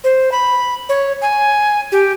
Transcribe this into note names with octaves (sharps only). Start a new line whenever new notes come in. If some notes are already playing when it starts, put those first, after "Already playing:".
C5
B5
C#5
G#5
G4